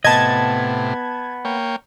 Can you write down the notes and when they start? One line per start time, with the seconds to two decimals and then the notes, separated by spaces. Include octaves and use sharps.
0.04 A2 C3 B3 D#5 A5 G#6
1.45 A#3 C#5 G5